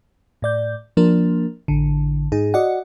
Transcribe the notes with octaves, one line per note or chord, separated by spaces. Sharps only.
A2 D5 G6
F3 A#3 D4 A#4
A1 D3
G#2 D#4 G#4
F#4 D5 D#5 F#5